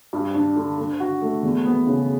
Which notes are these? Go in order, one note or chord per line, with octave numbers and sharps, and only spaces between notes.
G2
D4
D3
D3
F#4
A3
E2
B3
C#3